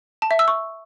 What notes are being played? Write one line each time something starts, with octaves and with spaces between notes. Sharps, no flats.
A5
E5
E6
C#6